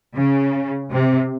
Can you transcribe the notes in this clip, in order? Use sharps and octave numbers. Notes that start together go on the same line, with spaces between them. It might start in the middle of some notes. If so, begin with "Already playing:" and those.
C#3
C3